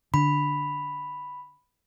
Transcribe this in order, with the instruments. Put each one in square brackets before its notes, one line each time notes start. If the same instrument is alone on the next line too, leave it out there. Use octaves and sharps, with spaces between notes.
[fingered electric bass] D3 [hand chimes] B5